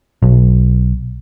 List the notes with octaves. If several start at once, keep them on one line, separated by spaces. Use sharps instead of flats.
B1